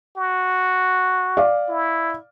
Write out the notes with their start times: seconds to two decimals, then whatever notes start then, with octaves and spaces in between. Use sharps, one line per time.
0.17 F#4
1.37 D5 F5
1.68 E4